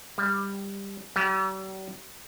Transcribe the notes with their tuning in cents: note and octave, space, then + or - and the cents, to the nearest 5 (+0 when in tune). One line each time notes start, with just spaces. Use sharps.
G3 +15
G3 -45